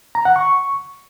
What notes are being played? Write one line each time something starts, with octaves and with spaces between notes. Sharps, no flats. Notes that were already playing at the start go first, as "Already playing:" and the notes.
A#5
F#5
C#6